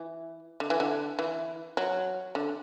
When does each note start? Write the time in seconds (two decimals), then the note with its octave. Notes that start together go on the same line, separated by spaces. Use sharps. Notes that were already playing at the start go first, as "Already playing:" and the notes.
Already playing: E3
0.60 D3
0.70 E3
0.80 D3
1.19 E3
1.77 F#3
2.35 D3